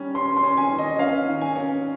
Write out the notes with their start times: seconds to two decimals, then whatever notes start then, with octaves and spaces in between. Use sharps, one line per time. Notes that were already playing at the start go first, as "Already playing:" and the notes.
Already playing: D#3 G3 C#4
0.15 C#4 C6
0.37 C6
0.43 C#4
0.57 G#5
0.71 D#3
0.78 D#5
0.99 C#4 F5
1.27 D#3
1.41 G#5
1.55 C#4